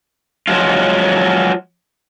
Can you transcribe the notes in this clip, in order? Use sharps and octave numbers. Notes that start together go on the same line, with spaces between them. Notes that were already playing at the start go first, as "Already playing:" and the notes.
F3 F#3 G#3 F4